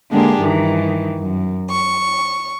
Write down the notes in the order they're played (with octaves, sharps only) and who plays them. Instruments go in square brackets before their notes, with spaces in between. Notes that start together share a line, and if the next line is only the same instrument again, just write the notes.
[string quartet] D3 G#3 A#3 D4 G4 G#4
G2 D#3 E3
F#2
C#6